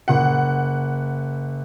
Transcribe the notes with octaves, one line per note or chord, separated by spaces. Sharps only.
F#1 F#5